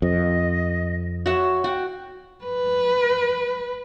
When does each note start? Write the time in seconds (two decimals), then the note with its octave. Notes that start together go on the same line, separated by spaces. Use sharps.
0.02 F2 D#5
1.26 F#4 C#5 E5
1.64 F#4 G5
2.45 B4